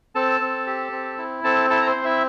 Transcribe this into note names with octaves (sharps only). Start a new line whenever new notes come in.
C4 A4 A5
C4
G4
C4
E4
C4 A4 A5
E4 A4 A5
A#5
C5 C6
C4
E4 E5